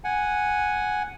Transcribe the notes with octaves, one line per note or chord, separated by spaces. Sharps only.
F#5 G#5